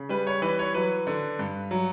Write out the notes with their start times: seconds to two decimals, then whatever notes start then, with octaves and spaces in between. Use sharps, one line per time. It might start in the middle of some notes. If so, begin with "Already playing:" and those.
Already playing: C#3
0.09 G3 B4
0.27 C#5
0.42 E3 B4
0.59 C#5
0.74 F#3 B4
1.07 D3
1.39 G2
1.71 F#3